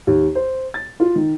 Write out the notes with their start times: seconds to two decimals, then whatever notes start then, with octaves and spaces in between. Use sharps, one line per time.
0.07 D#2
0.35 C5
0.74 A6
1.00 F4
1.16 D#3